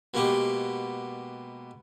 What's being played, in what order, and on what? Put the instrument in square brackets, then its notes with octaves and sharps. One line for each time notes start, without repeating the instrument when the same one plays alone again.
[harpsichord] B2 G#3 A#3 B3 G4